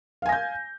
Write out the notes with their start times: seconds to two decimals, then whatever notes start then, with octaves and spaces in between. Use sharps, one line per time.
0.22 F5
0.26 G#5
0.29 A#6
0.32 G6